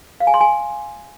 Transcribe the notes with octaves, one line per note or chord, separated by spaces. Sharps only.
F5
G#5
C6
G#5